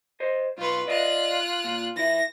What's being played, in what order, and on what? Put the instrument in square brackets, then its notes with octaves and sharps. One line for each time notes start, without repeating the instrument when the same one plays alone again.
[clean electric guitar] C5 D#5
[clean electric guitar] B1 C6 [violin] F4 B4
[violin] F4 F#6 [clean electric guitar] D5 D#5 F5
[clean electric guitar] A#2
[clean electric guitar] E3 E4 [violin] A#6